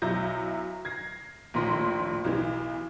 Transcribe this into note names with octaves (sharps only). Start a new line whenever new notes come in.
B1 F#3 E4 G6 A#6
G#6 A#6 C7
A#1 D#2 A2 C6 A#6
B1 E3